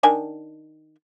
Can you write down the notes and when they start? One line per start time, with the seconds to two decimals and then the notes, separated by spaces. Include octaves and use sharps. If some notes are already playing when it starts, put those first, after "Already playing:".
0.03 D#3 D4 G#5